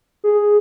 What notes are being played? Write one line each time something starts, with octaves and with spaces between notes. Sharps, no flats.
G#4